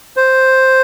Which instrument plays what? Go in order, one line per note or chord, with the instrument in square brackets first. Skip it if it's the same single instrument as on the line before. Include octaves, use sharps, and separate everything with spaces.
[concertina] C5